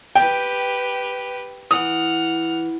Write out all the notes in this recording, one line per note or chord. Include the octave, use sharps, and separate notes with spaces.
G4 B4 G5
E3 F#5 D#6 F6